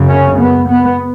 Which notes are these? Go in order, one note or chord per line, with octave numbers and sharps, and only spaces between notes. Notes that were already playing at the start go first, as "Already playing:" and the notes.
Already playing: F#2 C#3
C#4
B3
B3